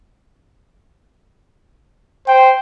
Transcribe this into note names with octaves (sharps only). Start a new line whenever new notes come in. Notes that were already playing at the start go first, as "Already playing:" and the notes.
C5 G5